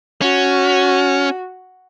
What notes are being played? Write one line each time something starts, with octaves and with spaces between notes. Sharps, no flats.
C#4 F#4